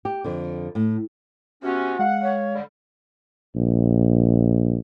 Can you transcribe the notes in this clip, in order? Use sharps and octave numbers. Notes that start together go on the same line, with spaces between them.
G4
F2 D3
A2
C3 B3 C#4 F#4
G#3 F5 F#5
C#5
D3 G3
A#1